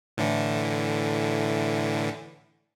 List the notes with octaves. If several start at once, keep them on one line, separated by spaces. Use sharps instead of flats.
A2 D3 E3